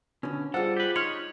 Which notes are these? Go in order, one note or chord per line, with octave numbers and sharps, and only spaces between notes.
B2 D3 C#4
G3 F4 G#4 A4 C5 F#5
G4 B4
D#4 C#5 C6 F6 F#7